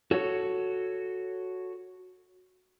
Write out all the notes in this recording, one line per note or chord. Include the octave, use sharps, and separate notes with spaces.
F#4 A4 C#5